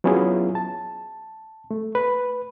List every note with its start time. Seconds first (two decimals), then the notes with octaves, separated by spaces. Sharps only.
0.04 F#3 B3 C#4 E4 F4 G#4
0.55 A5
1.71 A3
1.95 B4